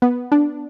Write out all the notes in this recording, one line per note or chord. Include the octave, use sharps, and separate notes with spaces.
B3
D4